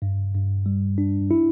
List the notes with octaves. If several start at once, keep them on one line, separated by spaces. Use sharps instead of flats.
G2
G2
G3
D4
E4